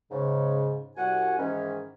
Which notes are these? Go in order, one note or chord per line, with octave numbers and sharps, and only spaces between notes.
G#2 C#3
C2 F#4 F#5 G#5
G#2 D#3 E3 C#4